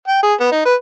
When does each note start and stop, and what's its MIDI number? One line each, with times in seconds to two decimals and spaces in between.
0.08 0.19 79
0.22 0.33 68
0.40 0.47 59
0.52 0.62 63
0.65 0.75 71